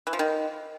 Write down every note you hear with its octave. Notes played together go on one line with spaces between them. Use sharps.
E3
F3
D#3